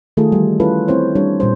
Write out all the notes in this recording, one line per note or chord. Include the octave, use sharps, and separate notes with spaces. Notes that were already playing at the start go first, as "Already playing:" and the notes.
D#3 A3 F4 G#4 A4
E3 G3
C#4 E4 F4 A4 B4 C#5
C4 E4 C5 C#5
G3 D4 C#5
A#2 G3 C5